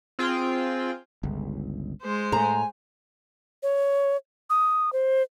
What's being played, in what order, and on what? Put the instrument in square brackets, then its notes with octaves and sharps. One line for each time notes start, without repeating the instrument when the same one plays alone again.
[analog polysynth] C4 F4 G#4 G5
[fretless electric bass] G1 C#2
[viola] G#3 C5
[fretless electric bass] A2 A3 [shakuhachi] G#5 [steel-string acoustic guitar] A#5
[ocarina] C#5
D#6
C5